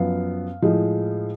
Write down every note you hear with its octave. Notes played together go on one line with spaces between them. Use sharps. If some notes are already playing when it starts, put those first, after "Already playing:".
Already playing: F#2 F3 B3 F5
A2 F3 G#3